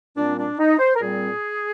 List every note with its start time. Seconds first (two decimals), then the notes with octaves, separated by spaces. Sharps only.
0.16 A#2 G3 C4 D4
0.38 D4
0.59 D#4
0.79 C5
0.95 A#4
1.01 A#2 G3 C4 G#4